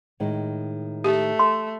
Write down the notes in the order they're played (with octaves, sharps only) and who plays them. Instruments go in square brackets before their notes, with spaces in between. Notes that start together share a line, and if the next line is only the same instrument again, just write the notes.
[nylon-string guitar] A2 D#3 G#3
[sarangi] A3 [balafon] G4
[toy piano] C6